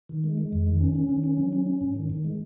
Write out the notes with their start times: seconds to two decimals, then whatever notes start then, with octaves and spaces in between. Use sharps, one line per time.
0.09 D#3
0.24 G#3
0.38 G#3
0.53 F2
0.67 D#3
0.81 C#4
0.95 C#4
1.09 D#3
1.24 C#4
1.38 F#3
1.53 C#4
1.66 C#4
1.81 G#2
1.95 D#3
2.10 D#3
2.24 G#3